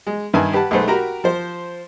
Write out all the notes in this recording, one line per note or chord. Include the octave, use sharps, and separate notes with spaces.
G#3
G2 D#3 B4 E5 G#5 A5
G4 B4 F#5 A5
B1 G#3 A3 B4 C5
F#4 G4 A#4 G5 A#5 B5
F3 C5